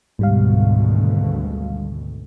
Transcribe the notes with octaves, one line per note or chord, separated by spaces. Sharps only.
G#1 D2 G#2 B2 G3 F5